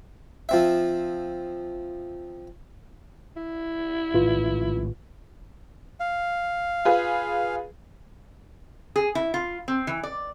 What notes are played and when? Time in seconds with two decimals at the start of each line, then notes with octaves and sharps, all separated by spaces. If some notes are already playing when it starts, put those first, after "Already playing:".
0.49 F3 C4 E5
3.37 E4
4.14 A#1 A2 D#3 F4 B4
6.00 F5
6.85 F4 G#4 B4
8.96 G#4
9.15 E4
9.34 F4
9.68 C4
9.87 E3
10.03 D5